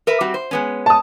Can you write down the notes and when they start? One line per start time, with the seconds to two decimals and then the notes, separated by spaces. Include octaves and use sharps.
0.07 A#4 B4 E5
0.21 G3 C4 F#4
0.34 C5
0.51 G#3 B3 C#4
0.86 A5 D#6